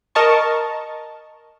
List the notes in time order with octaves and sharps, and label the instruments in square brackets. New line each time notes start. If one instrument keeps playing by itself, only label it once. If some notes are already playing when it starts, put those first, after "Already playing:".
[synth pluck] A#4 D#5 A5 C#6